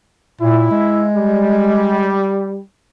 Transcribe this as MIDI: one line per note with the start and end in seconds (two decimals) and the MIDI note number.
0.41 0.66 46
0.41 1.04 64
0.71 2.24 56
1.16 2.60 55